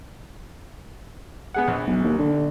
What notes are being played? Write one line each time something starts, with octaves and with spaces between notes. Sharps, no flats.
B3 G#4 F#5
A#1
B1
D#2
D3